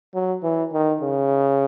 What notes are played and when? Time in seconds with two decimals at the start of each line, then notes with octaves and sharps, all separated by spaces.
0.14 F#3
0.43 E3
0.73 D#3
1.01 C#3